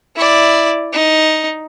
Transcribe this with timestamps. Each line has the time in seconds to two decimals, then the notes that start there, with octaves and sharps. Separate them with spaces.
0.16 E4 D5
0.93 D#4